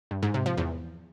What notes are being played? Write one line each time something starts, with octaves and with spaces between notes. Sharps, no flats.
G2
G#2
C3
F3
E2